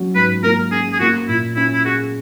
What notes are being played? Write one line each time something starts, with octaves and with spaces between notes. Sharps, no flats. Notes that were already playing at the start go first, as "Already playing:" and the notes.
Already playing: F#3 C#4
G#2 B4
A#3 A#4
C#4 G#4
G#4
A#3 F#4
A#2 E4
C#4 E4
E4
F#4 G#4